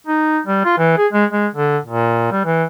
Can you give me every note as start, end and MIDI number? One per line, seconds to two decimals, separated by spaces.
0.07 0.40 63
0.46 0.60 55
0.65 0.75 65
0.78 0.96 52
0.98 1.07 68
1.13 1.25 56
1.31 1.47 56
1.55 1.78 50
1.85 2.29 46
2.31 2.42 55
2.45 2.64 52